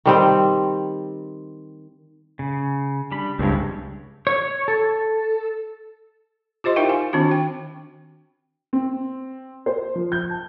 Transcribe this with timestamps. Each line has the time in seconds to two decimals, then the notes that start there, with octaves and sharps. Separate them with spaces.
0.05 D#3 G3 C4
2.39 C#3
3.12 G3 D4 B5
3.39 C#2 G2 C4 C#5
4.27 C#5
4.68 A4
6.64 F4 G4 C5 D#5 C6
6.76 D#4 E4 A#4 E5 F5 G5
6.89 G#5
7.13 D#3 C4 D4 F#4
7.31 G5
8.73 C4
9.66 C5
9.95 F3
10.12 G6
10.30 A5